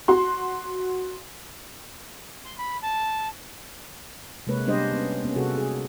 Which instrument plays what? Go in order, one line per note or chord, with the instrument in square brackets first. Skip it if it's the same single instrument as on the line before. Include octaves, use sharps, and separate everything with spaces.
[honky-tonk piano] F#4 C6
[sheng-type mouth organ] C6
B5
A5
[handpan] C3 G#3 A#3 B4 C#5
G3 B3 D4 G4 C5 D#5
B3 C#4
A#3 B3 C#4
C3 F#4 G#4 A4
G#4